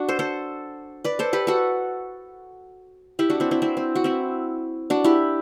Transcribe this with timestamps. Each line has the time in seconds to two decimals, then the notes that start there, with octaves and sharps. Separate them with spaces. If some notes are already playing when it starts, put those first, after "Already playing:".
Already playing: D4 F#4
0.09 A4 C5
0.19 A4 C5
1.04 B4 D5
1.19 A4 C5
1.33 G4 B4
1.47 F#4 A4
3.19 E4 G4
3.30 D4 F#4
3.40 C4 E4
3.51 C4 E4
3.62 C4 E4
3.77 C4
3.95 F#4
4.04 C4 E4
4.90 D4 F#4
5.04 E4 G4